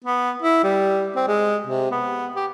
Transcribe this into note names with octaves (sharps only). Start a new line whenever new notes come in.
B3
E4
G3
C4
G#3
C3
B3
G4